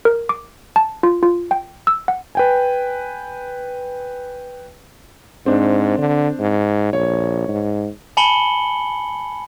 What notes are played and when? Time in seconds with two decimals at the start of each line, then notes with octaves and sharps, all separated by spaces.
0.05 A#4
0.29 D6
0.76 A5
1.03 F4
1.23 F4
1.51 G5
1.87 E6
2.08 F#5
2.35 B4 G5 G#5
5.46 G#2 C4 D4
5.98 D3
6.39 G#2
6.93 A#1 C#5
7.48 G#2
8.17 G#5 A5 B5 C#7 F#7 G7